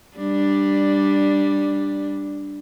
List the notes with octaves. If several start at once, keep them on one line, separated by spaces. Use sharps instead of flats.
G3 D4